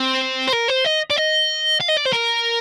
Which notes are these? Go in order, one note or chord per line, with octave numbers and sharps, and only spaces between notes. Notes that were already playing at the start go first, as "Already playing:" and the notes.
Already playing: C4
C5
A#4
C5
D#5
D5
D#5
F5
D#5
D5
C5
A#4